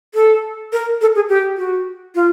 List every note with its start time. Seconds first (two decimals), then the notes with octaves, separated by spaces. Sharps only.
0.15 A4
0.72 A#4
1.01 A4
1.15 G#4
1.29 G4
1.57 F#4
2.15 F4